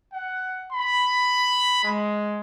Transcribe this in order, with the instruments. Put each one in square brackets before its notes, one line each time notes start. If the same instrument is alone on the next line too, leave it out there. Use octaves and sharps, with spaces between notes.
[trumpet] F#5
B5
G#3